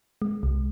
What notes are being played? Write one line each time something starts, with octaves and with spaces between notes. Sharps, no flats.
G#3
C2